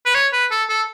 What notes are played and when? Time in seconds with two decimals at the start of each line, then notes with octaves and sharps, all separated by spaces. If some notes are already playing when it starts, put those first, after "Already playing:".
0.06 B4
0.15 C#5
0.33 B4
0.51 A4
0.69 A4